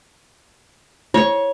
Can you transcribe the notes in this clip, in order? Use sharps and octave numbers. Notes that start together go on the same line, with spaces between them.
E4 C#5 C#6